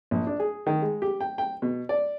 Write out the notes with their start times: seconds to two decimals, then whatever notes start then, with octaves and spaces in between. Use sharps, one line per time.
0.11 A#1
0.27 D4
0.39 G#4
0.67 D#3
0.82 G#3
1.02 G4
1.20 G5
1.38 G5
1.62 B2
1.89 D5